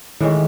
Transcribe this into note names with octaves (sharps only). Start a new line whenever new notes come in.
A2 D#3 E3 G#3 C#4